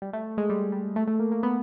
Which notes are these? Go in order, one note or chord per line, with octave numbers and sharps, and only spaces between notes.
G3
A3
G#3
G3
G3
A3
A3
A#3
A#3
B3